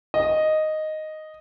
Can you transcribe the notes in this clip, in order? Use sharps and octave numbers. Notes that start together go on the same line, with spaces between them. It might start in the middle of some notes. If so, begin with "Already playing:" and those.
D#5